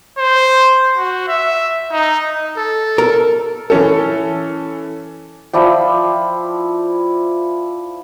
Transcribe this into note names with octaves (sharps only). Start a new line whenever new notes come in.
C5
F#4
E5
D#4
A4
A#4
E3 C#4 A4
F3 E4 D5 G5